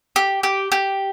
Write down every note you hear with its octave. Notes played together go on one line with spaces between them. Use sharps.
G4
G4
G4